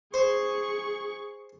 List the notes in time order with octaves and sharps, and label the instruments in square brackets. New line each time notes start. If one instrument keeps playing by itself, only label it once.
[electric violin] G#4 C#6 [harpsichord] C5